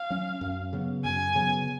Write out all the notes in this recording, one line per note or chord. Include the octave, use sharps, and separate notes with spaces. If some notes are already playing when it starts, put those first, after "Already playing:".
Already playing: F5
F#3 C#4
F#2
C#3 F#3 B3
F#2 G#5
C#3 F#3 B3